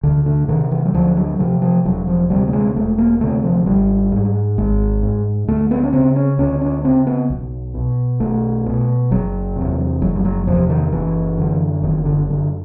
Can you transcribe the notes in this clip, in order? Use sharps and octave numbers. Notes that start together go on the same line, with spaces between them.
D2 D3
D3
C3 D#3
E3
F#3
D2 F3
F#3
C3 F3
F3
E1 F#3
F3
D2 C3 G3
A3
G#3
E1 A3
A#3
D2 C3 A3
F3
G#1 G3
G#2
G#1 G#3
G#2
D2 A3
B3
C#4
C#3 C4
C#4
D2 C#4
C#4
C#3 C4
B3
B1
B2
B1 A3
B2
F#1 F#3
E2 C3
F#1 F#3
G3
F#3
E2 C3 F3
D#3
F#1 E3
F#2 D3
F#1 D#3
D3
F#2 D3